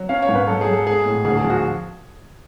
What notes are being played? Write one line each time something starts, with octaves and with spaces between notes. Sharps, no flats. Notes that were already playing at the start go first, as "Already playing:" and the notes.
Already playing: F#3
C#4 F5
C#5
G#2
B4
F#3 A4
G#4
F#3
A4
G#3 G#4
A2
D2 G#4
G#4
F3
F#4